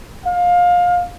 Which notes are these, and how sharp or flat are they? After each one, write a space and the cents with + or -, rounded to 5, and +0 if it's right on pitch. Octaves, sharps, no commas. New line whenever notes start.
F5 +25